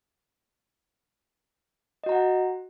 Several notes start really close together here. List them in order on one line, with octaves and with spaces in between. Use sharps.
D#5 F#4 A#5 F#5